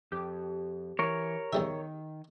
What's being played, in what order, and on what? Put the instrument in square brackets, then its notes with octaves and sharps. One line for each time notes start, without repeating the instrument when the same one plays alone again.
[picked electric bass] F2 [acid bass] G4
[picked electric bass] E3 [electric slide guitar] A#4 C#5
[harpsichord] E2 G3 E5 [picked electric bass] D#3